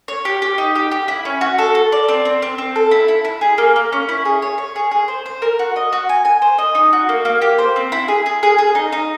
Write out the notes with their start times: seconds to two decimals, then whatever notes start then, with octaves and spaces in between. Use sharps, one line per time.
0.08 C#5
0.25 G4
0.42 G4
0.58 D#4
0.75 G4
0.91 G4
1.08 E4
1.25 C#4
1.41 F#4
1.58 A4
1.75 A4
1.92 D5
2.08 C4
2.25 C4
2.42 C4
2.58 C4
2.76 A4
2.91 E4
3.08 E4
3.25 E4
3.41 G#4
3.58 A#3
3.76 A#3
3.92 C#4
4.09 E4
4.25 G#4
4.42 C#5
4.58 C#5
4.76 G#4
4.91 G#4
5.08 C5
5.26 C5
5.42 A#4
5.59 F#4
5.76 D#5
5.93 F#4
6.09 G#5
6.25 G#5
6.42 C5
6.58 D#5
6.75 D#4
6.93 F#4
7.09 A#3
7.25 A#3
7.42 G4
7.58 C5
7.76 C4
7.92 E4
8.08 G#4
8.26 G#4
8.43 G#4
8.58 G#4
8.75 D#4
8.92 D#4